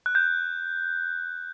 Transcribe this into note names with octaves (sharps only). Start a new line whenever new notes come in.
F#6
G6